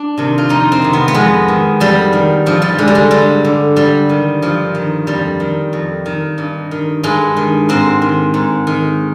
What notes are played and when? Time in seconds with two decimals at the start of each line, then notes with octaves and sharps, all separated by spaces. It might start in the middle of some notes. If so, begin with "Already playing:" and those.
Already playing: D4
0.18 C3 D#3
0.38 F4
0.49 F2 D#4
0.72 C4
0.82 C3 D#3
0.93 B3
1.08 B3
1.14 F2 G#3
1.48 D#3
1.80 F2 G3
2.13 D#3
2.46 G2 F3
2.62 G3
2.78 D3 G#3
2.88 G3
2.95 G#3
3.11 G2 G3
3.45 D3
3.76 G2 G3
4.09 D#3
4.42 G2 F3
4.75 D#3
5.07 F2 G3
5.40 D#3
5.73 F2
6.06 D#3
6.38 G2
6.71 D#3
7.03 G2 G#3
7.37 D#3
7.69 G#2 C4
8.02 D#3
8.34 G#2
8.67 D#3